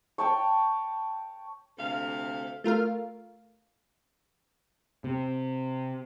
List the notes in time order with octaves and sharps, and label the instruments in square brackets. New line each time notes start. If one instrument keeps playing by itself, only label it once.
[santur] C#5 G5 A5 C#6
[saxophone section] D2 C3 E5 F5
[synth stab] A3 F4 A#4 F5
[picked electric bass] C3